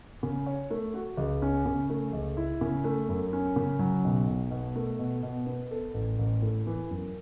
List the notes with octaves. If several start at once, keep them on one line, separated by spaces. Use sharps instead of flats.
C#3
C#5
A3
F#4
C#2
C#4
C#3
A3
C#2
E4
C#3
A3
F#2
C#4
C#3
F#3
B1
B1
B2
A3
B2
B2
B3
A4
A1
A1
A2
E3
F#2